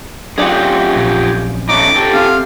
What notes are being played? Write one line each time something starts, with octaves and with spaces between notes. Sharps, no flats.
F#2 C3 F4 G4 G#4 D5
A#1
A3 C#4 D#4 D6
G4 A4
C3 F5